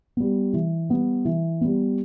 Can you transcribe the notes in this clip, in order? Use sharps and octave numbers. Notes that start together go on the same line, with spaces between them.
G3 B3
E3
G3 B3
E3
G3 B3